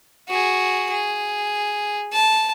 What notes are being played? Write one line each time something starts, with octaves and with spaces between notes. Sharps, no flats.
F#4 G#4
G#4
A5